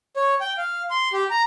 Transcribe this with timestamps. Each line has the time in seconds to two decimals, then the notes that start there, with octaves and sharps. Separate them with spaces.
0.16 C#5
0.41 G5
0.58 F5
0.91 C6
1.13 G4
1.30 A#5